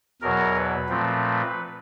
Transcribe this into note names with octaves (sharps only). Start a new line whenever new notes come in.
E2 B2 F#3 A#4
B4
A#2 F3 A3 C4